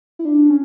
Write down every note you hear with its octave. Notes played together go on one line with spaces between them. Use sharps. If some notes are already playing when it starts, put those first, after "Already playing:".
E4
D4
C#4